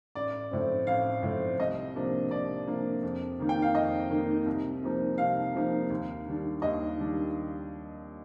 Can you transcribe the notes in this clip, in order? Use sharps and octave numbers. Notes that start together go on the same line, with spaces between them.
A1 D5
A2 F3 C4
A1 F5
A2 F3 C4
C2 D#5
C3 F3 A#3 D4
C2 D5
C3 F3 A#3 D4
F2
D#3 A#3 D#4
G5
F5
F2 D#5
D#3 A#3 D#4
C2
C3 F3 A#3 D#4
C2 F5
C3 F3 A#3 D#4
D#2
D#3 G3 D4
D#2 D#5
D#3 G3 D4